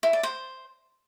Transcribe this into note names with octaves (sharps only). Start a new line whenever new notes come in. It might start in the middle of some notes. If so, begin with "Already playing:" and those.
E4
D5
C5